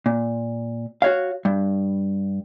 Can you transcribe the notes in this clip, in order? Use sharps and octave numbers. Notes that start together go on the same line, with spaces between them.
A#2
F#4 C#5 F5
G2